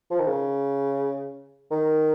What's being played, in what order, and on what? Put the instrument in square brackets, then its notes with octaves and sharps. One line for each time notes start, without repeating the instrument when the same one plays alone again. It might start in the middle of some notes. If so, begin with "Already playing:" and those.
[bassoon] F3
D#3
C#3
D#3